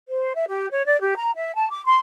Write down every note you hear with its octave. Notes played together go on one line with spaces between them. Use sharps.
C5
E5
G4
C#5
D5
G4
A#5
E5
A5
D6
C6